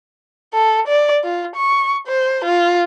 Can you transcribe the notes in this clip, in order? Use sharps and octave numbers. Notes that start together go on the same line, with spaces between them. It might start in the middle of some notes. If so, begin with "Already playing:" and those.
A4
D5
F4
C#6
C5
F4